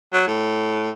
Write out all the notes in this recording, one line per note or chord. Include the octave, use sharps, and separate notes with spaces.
F#3
A2